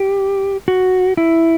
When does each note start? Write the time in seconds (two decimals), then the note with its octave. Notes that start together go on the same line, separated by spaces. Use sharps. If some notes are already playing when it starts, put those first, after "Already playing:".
Already playing: G4
0.68 F#4
1.17 E4